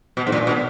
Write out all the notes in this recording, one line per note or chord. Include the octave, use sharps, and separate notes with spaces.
B2
G#2
A#2
B2